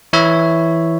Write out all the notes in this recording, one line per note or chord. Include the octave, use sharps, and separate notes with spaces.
E3 E4 C#5 E5